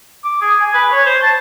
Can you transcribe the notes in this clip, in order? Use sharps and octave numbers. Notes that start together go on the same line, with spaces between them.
D6
G#4
G#5
B4
C#5
C5
A5